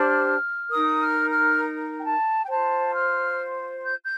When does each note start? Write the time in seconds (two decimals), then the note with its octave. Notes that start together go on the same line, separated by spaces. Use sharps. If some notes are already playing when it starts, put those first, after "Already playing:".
Already playing: D4 G4 C5 F6
0.69 D#4 A#4 D#6
0.99 F6
1.29 F6
1.98 G5
2.04 A5
2.44 G5
2.48 F4 C5 A5
2.93 F6
3.83 G6
4.02 G6